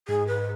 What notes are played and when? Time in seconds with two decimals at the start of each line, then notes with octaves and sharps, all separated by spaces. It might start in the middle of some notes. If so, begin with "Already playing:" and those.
0.08 G#2 G#4
0.27 B4